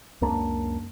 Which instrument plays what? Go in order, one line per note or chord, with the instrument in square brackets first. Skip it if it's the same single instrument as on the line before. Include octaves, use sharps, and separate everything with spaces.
[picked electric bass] C#2 F#2 A#3 D4